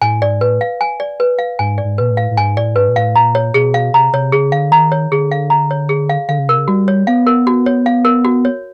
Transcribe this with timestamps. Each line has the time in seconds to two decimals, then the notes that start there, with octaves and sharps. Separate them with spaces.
0.01 A2 G#5
0.21 G#2 D5
0.41 A2 B4
0.61 F5
0.81 G#5
1.00 D5
1.20 B4
1.39 F5
1.59 G#2 G#5
1.78 D5
1.84 G#2
1.98 A#2 B4
2.11 A2
2.17 F5
2.31 A2
2.37 G#2 G#5
2.57 A2 D5
2.76 G#2 B4
2.89 A#2
2.96 A2 F5
3.16 A#2 A#5
3.35 C#5
3.54 B2 G#4
3.74 F5
3.94 C3 A#5
4.13 C3 C#5
4.32 C#3 G#4
4.52 D3 F5
4.72 D#3 A#5
4.92 C#5
5.12 D3 G#4
5.31 F5
5.50 A#5
5.71 C#5
5.89 G#4
6.09 F5
6.29 D3 F5
6.39 C#3
6.49 C3 A#4
6.58 C#3
6.68 G3 F#4
6.88 C#5
7.07 B3 F5
7.27 A#4
7.47 F#4
7.66 C#5
7.86 F5
8.05 A#4
8.24 F#4
8.45 C#5